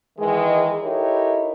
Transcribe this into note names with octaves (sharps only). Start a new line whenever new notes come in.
D#3 E3 G#3
D#4 E4 G4 A4 A#4 C#5